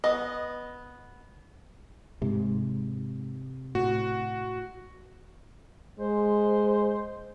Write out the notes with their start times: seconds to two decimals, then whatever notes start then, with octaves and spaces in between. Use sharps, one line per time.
0.04 B3 D#5
2.22 G#2 C3
3.75 A2 F#4
5.99 G#3 C5